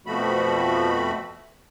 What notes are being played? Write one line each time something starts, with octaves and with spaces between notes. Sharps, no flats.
F2 B2 F3 A3 F#4 B5